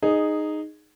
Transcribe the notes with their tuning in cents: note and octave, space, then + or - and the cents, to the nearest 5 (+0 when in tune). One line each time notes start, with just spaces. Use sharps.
D#4 -10 G#4 +0